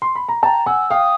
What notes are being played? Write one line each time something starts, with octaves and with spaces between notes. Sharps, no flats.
C6
B5
A#5
G5 A5 A#5
F#5 G#5 E6
F5 G5 D#6